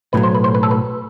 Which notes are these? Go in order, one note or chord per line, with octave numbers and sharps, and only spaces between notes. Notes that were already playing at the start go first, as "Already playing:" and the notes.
B1 A2 F#3 B4
C5
B4
C5
B4
A4
B4